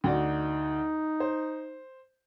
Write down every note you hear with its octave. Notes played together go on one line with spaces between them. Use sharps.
D2 D#4 F#4 D5
C5